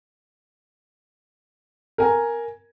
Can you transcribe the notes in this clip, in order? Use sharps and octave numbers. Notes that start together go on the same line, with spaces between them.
A#4 G#5